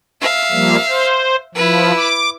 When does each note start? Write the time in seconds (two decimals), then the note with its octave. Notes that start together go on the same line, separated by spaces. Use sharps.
0.21 E5 F5
0.52 F3 G3 A#3
0.89 C5
1.55 F3 E4 B4
1.96 D6